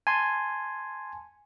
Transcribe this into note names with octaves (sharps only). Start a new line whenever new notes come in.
G#5 A5 C6